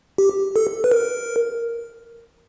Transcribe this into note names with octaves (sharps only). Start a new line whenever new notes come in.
G4
A4
B4
A#4